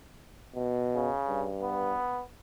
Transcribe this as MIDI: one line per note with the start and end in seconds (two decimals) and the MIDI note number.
0.55 1.11 47
0.95 1.47 49
1.28 1.97 43
1.62 2.22 59